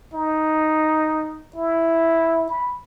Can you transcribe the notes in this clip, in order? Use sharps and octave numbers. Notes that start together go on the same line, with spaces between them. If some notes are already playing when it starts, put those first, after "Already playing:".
D#4
E4
B5